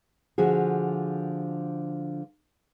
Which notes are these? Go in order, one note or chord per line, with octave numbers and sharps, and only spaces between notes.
D3 F3 F#4 G#4